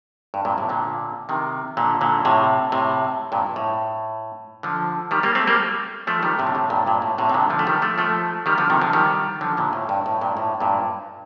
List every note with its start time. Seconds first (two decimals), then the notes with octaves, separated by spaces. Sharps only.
0.34 G2
0.45 G2 A#2
0.58 A2 C3
0.69 A#2 D3
1.29 C3 D#3
1.77 A#2 D3
2.01 A#2 D3
2.25 A2 C3
2.72 A2 C3
3.32 G2 A#2
3.56 A2
4.63 D3 F3
5.11 D#3 G3
5.23 G3 A#3
5.35 A3 C4
5.47 G3 A#3
6.07 F3 A3
6.22 D#3 G3
6.39 A2 C3
6.47 D3
6.55 A2 C3
6.70 G2 A#2
6.86 G2 A#2
7.02 A2
7.18 A2 C3
7.29 C3
7.34 A#2 D3
7.50 D3 F3
7.59 A3
7.67 D#3 G3
7.82 F3 A3
7.98 F3 A3
8.46 D#3 G3
8.58 D3 F3
8.70 C3 D#3
8.81 D3 F3
8.93 D#3 G3
9.41 D3 F3
9.57 A#2 D3
9.73 A2
9.89 G2
10.06 A2
10.21 G2 A#2
10.37 A2
10.60 G2 A#2